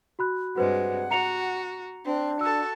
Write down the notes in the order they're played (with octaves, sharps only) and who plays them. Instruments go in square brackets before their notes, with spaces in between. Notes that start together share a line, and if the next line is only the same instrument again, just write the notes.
[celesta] F#4 B5 F#6
[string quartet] G2 C3 G#3 [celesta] F#4 B4 C5 [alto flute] F#5
[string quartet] F#4 [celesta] A#5 C#7 F7
[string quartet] C4 [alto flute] D4
[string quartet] F#4 A4 [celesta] E6